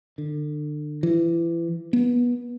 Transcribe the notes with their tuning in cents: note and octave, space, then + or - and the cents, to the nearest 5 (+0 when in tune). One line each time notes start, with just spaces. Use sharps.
D3 +30
E3 +30
B3 -20